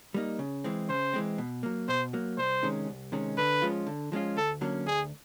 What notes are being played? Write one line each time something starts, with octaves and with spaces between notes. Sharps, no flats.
G3 A#3 D#4
C#3
E3 G#3 C4
C#3 C5
E3 G#3 C4
B2
F#3 A#3
B2 C5
F#3 A#3
C2 C5
C3 D#3 G#3 C#4
C2
C3 D#3 G#3 C#4
D3 B4
F3 G#3 C#4 F4
D3
F3 G#3 C#4 F4
D2 A4
D3 F#3 A#3 C#4
D2 G#4